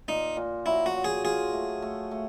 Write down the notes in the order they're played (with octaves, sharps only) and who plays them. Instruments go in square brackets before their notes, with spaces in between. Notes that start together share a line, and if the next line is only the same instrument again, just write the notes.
[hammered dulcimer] A#2 [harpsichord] D#4
[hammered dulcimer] A#2
[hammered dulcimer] F#3 [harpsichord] E4
[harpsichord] F#4
[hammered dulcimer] F#3
[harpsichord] G#4
[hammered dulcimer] F4 [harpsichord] G#4
[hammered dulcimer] A3
A3
A3